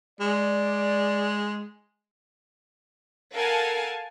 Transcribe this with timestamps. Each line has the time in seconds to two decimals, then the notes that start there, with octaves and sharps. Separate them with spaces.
0.20 G#3 D5
3.34 A4 A#4 F5 F#5 G#5 A5